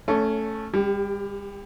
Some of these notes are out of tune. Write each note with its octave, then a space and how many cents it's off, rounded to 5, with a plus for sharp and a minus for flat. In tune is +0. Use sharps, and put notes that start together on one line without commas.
A3 +0 C#4 +0 C#5 +25
G3 +40 G4 +0